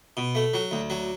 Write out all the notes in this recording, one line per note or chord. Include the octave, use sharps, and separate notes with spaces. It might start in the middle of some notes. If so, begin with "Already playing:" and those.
B2
A3
F#3
D2
F#3